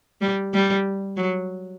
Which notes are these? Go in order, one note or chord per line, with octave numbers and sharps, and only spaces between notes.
G3
G3
F#3